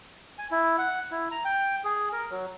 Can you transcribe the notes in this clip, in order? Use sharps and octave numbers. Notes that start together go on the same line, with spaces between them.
G#5
E4
F#5
E4
A#5
G5
G#4
A#4
F#3